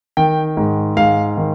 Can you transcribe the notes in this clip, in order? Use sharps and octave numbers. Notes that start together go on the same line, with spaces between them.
D#3 G5
G#2
G#2 F5
D#3